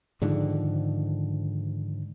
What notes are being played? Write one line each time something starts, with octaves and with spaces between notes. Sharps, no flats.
G#2 D3 D#3 F3